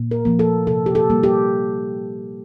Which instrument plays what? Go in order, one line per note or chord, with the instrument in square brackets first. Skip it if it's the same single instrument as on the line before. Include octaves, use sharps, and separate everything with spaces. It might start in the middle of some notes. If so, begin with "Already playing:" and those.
Already playing: [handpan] A#2
A#4
F3 A#3
A4
C3 A4
G4
A4
G3 A#3
G4